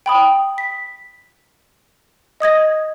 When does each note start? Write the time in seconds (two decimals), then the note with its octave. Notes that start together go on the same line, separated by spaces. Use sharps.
0.06 G5 B5 D#6
0.58 B6
2.40 D#5 D#6 G#6 A#6